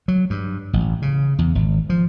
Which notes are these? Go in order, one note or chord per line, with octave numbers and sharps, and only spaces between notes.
F#3
G2
A1
C#3
E2
G#1
F3